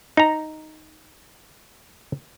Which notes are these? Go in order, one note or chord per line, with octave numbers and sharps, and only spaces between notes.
D#4 A#5